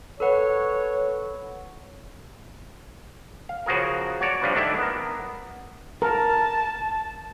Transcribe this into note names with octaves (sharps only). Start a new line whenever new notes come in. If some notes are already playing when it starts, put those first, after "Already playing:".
A4 B4 C#5 F#5
F5
C#3 F3 F#4 G#4 A#4
F#4 C#5 D5
G2 F3 D4 B4 F#5
D#3 A3 D4 E4
B3 A#4
A#4 A5